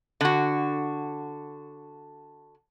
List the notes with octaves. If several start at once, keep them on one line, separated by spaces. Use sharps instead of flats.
D3 F#4